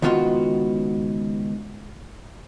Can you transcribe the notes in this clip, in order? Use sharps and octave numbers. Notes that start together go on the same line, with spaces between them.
C#2 D#3 B3 F4 F#4 C6